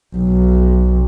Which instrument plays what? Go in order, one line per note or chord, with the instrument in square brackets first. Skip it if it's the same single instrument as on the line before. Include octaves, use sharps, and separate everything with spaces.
[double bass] B1